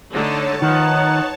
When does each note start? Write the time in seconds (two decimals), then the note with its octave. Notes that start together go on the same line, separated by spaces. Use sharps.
0.11 D3 A3 D#4 C#5 A5
0.62 D#3 F3 D#4 B4 F#5